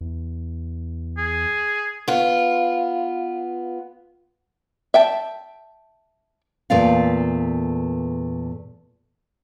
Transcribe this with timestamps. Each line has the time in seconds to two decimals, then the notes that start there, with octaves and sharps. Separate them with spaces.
0.01 E2
1.18 G#4
2.08 B3 F4
4.94 E5 G5 A5
6.70 E2 A#2 A3 F4 D5 F5